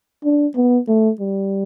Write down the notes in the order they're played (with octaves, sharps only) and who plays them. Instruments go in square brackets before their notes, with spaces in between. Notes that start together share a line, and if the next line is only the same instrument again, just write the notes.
[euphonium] D4
B3
A3
G3